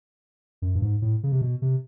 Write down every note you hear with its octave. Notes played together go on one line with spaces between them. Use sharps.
F#2
G2
G#2
A2
C#3
C3
B2
C3